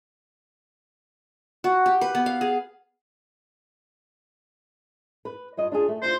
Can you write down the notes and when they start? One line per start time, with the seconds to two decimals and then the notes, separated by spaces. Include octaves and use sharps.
1.64 F#4
1.86 G4
2.01 B4
2.15 B3
2.26 F5
2.41 G#4
5.25 B4
5.57 G2 F4 D#5
5.72 D4 F4 G#4
5.88 A3
6.02 D4 F4 C5